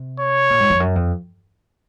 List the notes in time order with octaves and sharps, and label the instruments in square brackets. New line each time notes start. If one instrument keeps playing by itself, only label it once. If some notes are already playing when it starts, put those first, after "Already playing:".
Already playing: [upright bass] C3
[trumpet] C#5
[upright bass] A#2
G#2
F2
F#2
F2